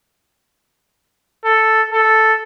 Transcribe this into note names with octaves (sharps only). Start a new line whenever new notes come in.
A4
A4